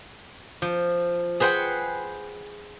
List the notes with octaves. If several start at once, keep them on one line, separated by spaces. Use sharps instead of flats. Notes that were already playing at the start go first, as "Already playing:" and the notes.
F3
G#4 B4 C5 F#5 G5